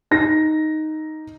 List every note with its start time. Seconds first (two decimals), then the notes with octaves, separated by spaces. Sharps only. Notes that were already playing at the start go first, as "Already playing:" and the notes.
0.11 D#4 A#6